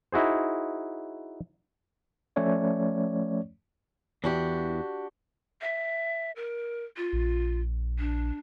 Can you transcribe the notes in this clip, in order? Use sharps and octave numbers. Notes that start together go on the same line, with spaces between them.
D#4 E4 F#4 G#4 C5
F3 A3 C#4 C#5 D5
E2 E3 D4 F#4 G4
E5
A#4
F4
A#1
D4